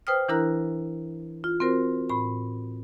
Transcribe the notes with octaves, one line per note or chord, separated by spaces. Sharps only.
B4 C5 G5 D#6 F6
E3 D4 E4 A#4 A#5 F#6
F4
C4 F4 F#4 A#4 C5
A2 B5